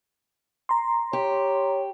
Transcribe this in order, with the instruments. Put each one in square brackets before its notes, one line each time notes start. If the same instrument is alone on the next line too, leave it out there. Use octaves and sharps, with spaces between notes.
[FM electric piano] A#5 C6
[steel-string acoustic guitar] G4 [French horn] C#5